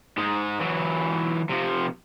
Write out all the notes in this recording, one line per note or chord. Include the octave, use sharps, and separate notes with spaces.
G#2 G#3
E3 F#3
C3 F3